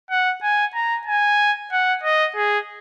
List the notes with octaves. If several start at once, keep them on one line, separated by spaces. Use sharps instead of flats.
F#5
G#5
A#5
G#5
F#5
D#5
G#4